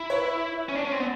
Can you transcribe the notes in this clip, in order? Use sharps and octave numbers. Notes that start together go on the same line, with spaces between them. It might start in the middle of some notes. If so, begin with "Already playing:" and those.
Already playing: E4
B4 C#5
C#4
D4
C#4
C4
B3